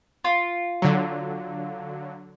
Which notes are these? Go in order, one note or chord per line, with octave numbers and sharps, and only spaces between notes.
F4
D3 F#3